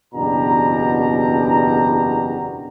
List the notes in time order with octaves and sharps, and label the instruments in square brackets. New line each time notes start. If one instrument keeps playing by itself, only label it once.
[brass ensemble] F#1 E2 B2 D4 G4 A#5